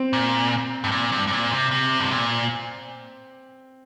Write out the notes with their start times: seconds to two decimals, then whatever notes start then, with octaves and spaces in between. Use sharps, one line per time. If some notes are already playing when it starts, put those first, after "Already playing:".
Already playing: C4
0.13 A#2
0.84 G2
0.92 A#2
1.12 G2
1.27 G2
1.32 A#2
1.51 C3
1.71 C3
1.99 G2
2.11 A#2